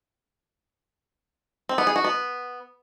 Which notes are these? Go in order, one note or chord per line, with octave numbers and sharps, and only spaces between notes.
C4
B3
G#4
F#4
B3